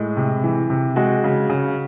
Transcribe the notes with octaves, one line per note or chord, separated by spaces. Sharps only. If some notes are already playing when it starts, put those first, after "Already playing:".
Already playing: A2 G#3
C3
E3
C3
G#3 F#4
C#3
C#3